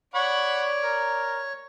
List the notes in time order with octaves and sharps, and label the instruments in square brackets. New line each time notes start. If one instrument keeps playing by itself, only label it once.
[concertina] C#5 [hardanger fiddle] D5 [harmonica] F#5 B5 C#6
[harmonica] A#4